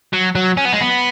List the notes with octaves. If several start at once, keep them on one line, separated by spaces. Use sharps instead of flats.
F#3
F#3
C#4
B3
G#3
B3